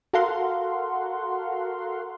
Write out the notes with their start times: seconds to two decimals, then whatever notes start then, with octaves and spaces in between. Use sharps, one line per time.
0.13 F#4 A4 A#4 F5 F#5 C6